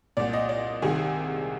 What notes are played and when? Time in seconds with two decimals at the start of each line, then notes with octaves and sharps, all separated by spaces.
0.17 C2 A#2 D5
0.33 D#5
0.49 D5
0.82 C2 C3 D#3 G#4